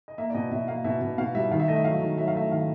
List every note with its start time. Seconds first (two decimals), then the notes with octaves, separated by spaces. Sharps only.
0.08 D#5
0.18 A#3 E5
0.30 D5
0.34 B2 D#5
0.51 B2 E5
0.68 A#3 F5
0.84 B2 E5
1.01 B2
1.18 B2 F5
1.35 G3 E5
1.51 D#3 F5
1.60 E5
1.68 A3 D#5
1.76 E5
1.84 F#3 F5
2.01 D#3
2.18 F#3 E5
2.28 F5
2.35 A3 E5
2.51 D#3 F5